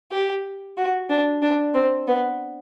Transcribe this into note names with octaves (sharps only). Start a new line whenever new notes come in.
G4
F#4
D4
D4
C4
B3